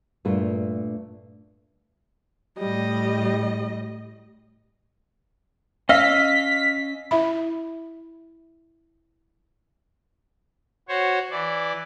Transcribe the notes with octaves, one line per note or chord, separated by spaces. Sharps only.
G2 A#2 A3 F4 A#4
A2 G3 D#5
C#4 D#5 F5 E6 B6
E4 E5 B5
F#4 C5 C#5
E3 D5